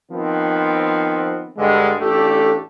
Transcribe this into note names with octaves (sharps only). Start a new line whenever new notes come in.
D#3 F3 B3 C4
G2 D3 G#3
A1 A3 D4 G4 A4